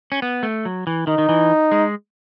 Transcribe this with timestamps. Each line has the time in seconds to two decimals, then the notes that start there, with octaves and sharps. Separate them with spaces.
0.12 C#4
0.22 B3
0.43 A3
0.65 F#3
0.87 E3
1.07 D#3 D#4
1.18 D#3
1.29 E3
1.72 G#3